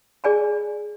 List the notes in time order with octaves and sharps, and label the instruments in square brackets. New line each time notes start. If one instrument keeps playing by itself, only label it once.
[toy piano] G#4 D5 G#5 B5